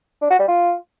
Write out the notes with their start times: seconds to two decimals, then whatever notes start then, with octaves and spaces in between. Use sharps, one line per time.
0.22 D4
0.31 F#4
0.39 G3
0.48 F4